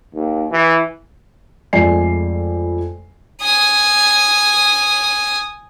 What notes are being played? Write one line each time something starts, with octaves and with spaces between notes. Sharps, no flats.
D#2
E3
F2 G#3 A3 D5 G#5 C7
G#5 D#6